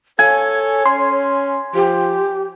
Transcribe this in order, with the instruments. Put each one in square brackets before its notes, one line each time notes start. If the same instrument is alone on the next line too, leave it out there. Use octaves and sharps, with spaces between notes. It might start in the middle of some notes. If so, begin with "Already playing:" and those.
[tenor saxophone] A4 [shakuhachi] C#5 [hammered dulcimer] G#5
[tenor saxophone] C#4 [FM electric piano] C6
[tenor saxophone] F3 [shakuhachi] G4